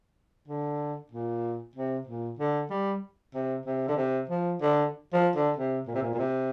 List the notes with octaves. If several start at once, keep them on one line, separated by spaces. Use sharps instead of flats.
D3
A#2
C3
A#2
D3
G3
C3
C3
D3
C3
F3
D3
F3
D3
C3
A#2
C3
A#2
A#2
C3